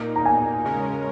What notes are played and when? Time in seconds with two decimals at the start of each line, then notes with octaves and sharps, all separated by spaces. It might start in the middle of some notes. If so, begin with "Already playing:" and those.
Already playing: A#2 A#3 D#4
0.16 A#5
0.25 G#5
0.64 C#3 G#3 C#4 A#4